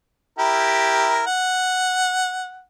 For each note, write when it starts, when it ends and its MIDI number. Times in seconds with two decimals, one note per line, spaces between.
0.39 1.22 64
0.39 1.22 67
0.39 1.22 70
1.27 2.64 78